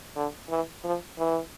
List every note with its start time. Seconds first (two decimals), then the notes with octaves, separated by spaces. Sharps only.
0.15 D3
0.49 E3
0.84 F3
1.18 E3